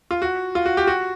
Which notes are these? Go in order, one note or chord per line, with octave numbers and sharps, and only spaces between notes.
F4
F#4
F4
F#4
G4
F#4